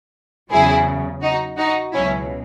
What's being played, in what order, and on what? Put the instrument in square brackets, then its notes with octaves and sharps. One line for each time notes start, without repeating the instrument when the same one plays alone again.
[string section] E2 C#3 F#3 E4 G#4
D#4 F#4
D#4 F#4
C#2 B2 F#3 C#4 E4